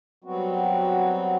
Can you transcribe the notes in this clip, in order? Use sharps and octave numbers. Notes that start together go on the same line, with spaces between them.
F#3 G3 B3 C4 F#4